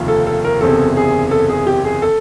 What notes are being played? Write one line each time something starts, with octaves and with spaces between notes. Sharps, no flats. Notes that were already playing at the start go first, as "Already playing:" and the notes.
Already playing: F1 D#2 C#3 F3
A4
A4
A#4
F#1 E2 C3 A4
G#4
A4
G#4
G4
G#4
A4